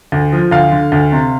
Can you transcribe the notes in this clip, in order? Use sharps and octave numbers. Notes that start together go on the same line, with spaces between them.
D2
F3
D2 F5
D3
D2
C3